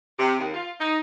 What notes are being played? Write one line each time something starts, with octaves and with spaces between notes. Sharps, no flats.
C3
D#2
F4
D#4